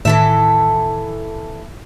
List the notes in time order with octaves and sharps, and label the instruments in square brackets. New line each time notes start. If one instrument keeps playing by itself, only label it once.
[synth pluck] A2 D#3 [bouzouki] E3 A4 E5